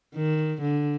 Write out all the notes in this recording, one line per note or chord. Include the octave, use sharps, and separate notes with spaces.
D#3
D3